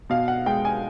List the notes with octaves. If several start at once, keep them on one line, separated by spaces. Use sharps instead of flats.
B2 F5
F#5
G#3 G5
G#5